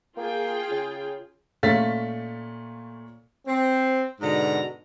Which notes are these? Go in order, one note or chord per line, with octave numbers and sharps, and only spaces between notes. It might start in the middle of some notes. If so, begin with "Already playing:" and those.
A#3 F4 G#4 G5
C#3
A#2 A3 C#4 F5 A6 B6
C4
G#2 B2 D3 A#5